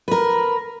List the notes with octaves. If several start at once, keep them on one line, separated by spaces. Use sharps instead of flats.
A#4 B4